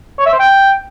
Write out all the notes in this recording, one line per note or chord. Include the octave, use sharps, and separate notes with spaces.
C#5
E5
C5
G5